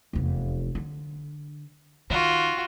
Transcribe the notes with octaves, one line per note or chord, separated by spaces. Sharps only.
F1 E2
D3
D#3 F4 F#4